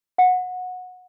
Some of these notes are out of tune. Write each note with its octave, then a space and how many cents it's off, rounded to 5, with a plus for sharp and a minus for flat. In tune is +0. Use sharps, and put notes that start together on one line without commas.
F#5 -20